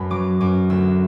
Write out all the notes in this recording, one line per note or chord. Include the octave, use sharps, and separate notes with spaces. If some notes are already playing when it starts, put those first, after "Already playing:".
Already playing: F#2 A5 B5
F#3 D6
F#2 D6
D2 E6